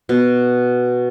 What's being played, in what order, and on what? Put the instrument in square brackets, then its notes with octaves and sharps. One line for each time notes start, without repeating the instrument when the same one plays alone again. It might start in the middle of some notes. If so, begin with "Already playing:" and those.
[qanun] B2